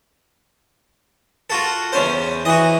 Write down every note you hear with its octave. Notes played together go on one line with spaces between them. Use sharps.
F4 F#4 A4
E2 C#4 C5
E3 F#4 D#5